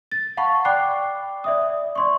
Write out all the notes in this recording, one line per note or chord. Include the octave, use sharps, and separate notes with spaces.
A6
F5 F#5 A5 B5 C#6
D5 G5 B5 D6 F#6 C7
D5 E5 D#6
D5 C6 C#6